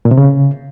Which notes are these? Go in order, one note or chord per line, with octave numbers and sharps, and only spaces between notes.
A#2
C3
C#3